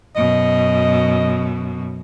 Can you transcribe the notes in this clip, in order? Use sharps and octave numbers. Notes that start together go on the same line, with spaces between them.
F#2 B2 D#5